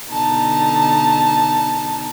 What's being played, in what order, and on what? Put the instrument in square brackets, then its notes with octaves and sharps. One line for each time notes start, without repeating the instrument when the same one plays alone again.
[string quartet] B2 D3 D#4 A5 A#5